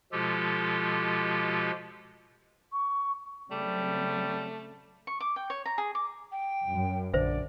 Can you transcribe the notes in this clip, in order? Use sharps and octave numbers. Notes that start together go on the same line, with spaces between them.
B2 F3 G#3 F4 G4 A4
C#6
C#3 F#3 G3 A3 C4
C#6
D6
G5
C#5
A#5
G#4
D6
G5
F#2
A#1 D3 C5 D5 E5